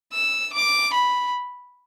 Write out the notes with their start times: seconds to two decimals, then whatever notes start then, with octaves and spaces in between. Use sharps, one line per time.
0.13 E6
0.54 D6
0.94 B5